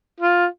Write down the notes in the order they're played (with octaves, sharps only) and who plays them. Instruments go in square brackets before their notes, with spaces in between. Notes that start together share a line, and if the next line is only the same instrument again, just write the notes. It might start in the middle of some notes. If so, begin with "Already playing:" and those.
[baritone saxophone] F4